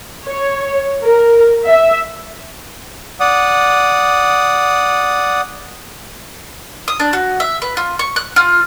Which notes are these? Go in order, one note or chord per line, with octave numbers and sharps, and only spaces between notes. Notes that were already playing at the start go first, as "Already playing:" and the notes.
C#5
A#4
E5
D5 F#5 D#6
D#6
D4
F#4
E5
B4
F4
C#6
F#6
F4